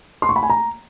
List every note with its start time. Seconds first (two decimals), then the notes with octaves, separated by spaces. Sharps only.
0.22 C6
0.29 C#6
0.36 B5
0.43 G#5
0.50 A#5